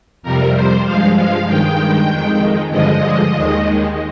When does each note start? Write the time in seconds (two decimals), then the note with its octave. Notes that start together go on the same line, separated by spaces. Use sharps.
0.22 F2 C3 G3 A#4
0.54 C5
0.84 G2 F3 G#3 F5
1.16 F5
1.47 G2 D#3 G#3 G5
2.09 F2 D#3 G#3
2.71 G2 D3 F3 G#3 D#5
3.34 D#2 D#3 G#3